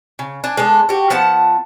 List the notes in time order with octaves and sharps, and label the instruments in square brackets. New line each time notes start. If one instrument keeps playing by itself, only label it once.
[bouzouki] C#3
D4 G#5
G#3 A3 B3 D4
F#4 G4
F3 B3 F#5 A5